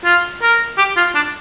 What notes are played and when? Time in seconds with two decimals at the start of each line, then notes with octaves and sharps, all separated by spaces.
0.05 F4
0.42 A#4
0.78 G4
0.97 F4
1.15 D4